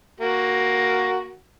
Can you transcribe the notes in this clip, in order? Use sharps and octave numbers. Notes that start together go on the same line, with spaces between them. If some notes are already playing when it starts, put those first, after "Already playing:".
A#3 F#4